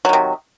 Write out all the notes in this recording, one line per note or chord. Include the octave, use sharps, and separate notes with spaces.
C3 D#3 F#3